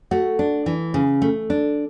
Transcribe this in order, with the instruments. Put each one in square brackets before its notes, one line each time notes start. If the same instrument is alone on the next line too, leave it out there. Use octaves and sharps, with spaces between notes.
[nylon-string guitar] A3 F#4
D4
E3
C#3
A3
D4